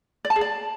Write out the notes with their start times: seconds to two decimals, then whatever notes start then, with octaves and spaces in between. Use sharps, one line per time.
0.25 D5
0.30 A5
0.36 G#4
0.41 D5